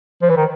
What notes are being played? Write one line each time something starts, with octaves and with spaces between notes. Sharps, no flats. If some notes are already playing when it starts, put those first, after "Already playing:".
F3
E3
D#3